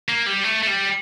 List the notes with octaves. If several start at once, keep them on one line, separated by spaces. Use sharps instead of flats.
A#3
G3
A3
A3
G3